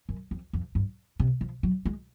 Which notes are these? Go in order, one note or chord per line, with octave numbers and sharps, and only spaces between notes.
F#2
F2
F2
G2
C3
F3
F#3
G#3